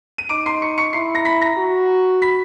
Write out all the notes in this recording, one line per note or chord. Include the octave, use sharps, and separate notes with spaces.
D#7
D#4 D6 D7
C6 C7
C#6 C#7
C#6 C#7
E4 C6 C7
A#5 A#6
B5 B6
A#5 A#6
F#4
B5 B6